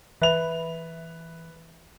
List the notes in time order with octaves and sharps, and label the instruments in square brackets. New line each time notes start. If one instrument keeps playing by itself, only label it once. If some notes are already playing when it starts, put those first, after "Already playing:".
[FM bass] E3 [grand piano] B4 F7 [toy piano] E5 B5